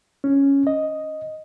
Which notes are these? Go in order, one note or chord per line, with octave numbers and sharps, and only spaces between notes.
C#4
D#5